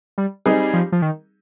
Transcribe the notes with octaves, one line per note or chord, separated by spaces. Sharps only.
G3
G3 C4 D#4 G#4
F3
F3
D#3